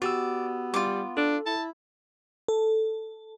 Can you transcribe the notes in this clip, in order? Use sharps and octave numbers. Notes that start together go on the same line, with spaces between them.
B3 F#4 G4 D5 E6
G3 F4 D6
D4 A4
E4 A5
A4